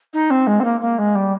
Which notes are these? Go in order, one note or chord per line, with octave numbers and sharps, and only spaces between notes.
D#4
C4
G#3
C4
A#3
A#3
G#3
G3